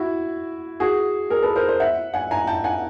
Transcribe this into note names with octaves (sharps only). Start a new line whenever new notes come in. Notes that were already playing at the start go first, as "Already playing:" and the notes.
Already playing: E4 F#4
F#4 G#4
G#4 A#4
A4 B4
A#4 C5
A#4 C5
E5 F#5
F#5 G#5
G#5 A#5
G5 A5
F#5 G#5